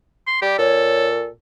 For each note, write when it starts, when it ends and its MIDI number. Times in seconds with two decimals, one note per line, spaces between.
0.27 0.38 84
0.42 0.58 55
0.42 0.55 67
0.58 1.27 46
0.58 1.29 69
0.58 1.07 73